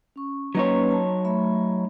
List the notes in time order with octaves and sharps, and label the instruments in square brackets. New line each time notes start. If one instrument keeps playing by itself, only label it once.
[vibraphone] C#4 C#6
[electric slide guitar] F#3 D#4 C#5 [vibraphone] A#3 C#4 B4
[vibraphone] A5
A3 E5 B5